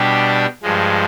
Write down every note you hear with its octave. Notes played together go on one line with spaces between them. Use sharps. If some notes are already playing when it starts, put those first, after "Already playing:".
Already playing: B2 G3 D4 G4
G2 F3 G#3